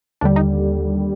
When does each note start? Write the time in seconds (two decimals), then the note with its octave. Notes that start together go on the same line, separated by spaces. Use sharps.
0.21 D#2 D3 G3 D4
0.36 D#4